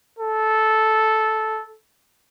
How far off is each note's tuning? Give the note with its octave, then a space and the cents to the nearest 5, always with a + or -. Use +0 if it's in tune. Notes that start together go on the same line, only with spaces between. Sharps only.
A4 -10